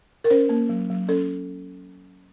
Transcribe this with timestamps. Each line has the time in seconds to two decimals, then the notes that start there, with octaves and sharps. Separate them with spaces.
0.24 A#4
0.31 C#4 C5
0.49 A#3
0.69 F#3
0.90 F#3
1.08 C#4 A4